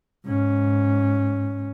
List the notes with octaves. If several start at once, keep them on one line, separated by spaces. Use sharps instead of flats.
G#2 C#4